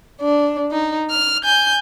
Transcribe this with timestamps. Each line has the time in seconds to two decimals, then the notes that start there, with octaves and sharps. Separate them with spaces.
0.21 D4
0.71 D#4
1.10 F6
1.44 G#5 G6